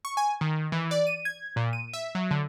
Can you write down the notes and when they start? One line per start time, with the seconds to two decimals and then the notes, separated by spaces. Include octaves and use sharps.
0.05 C#6
0.17 G#5
0.41 D#3
0.72 E3
0.91 D5
1.07 D#7
1.25 G#6
1.56 A#2
1.73 D#7
1.93 E5
2.15 F#3
2.31 D3